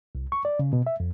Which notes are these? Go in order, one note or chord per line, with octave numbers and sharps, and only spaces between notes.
C2
C#6
D5
C#3
B2
E5
F2